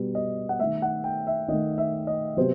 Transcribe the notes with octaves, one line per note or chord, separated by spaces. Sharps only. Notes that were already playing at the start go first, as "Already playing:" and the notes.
Already playing: B2 G3 B3
D#5
F#5
D#3 A3 E5
F#5
G5
E5
D#3 A3 D#5
E5
D#5
C3 F#3 B3 C5